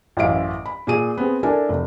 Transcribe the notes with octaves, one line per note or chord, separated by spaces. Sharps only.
A1 F#2 E3 E4 F5 D7
B5
A#2 G#4 D#7
B3 C4 G#4
D4 E4 A4 A#4 G#5
F1